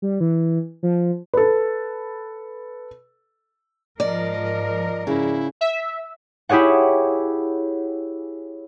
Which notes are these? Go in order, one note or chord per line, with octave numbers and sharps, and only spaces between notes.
G3
E3
F3
A4 B4
G#2 F3 A#4 D5 D#5
C#3 E4
E5
E4 G4 G#4 C#5 F#5